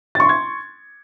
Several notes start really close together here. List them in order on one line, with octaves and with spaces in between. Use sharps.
A6 C#6 C6 G#6